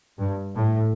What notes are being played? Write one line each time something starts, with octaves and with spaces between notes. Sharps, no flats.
G2
A2